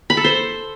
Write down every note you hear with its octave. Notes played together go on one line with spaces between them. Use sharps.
B5
A4
C5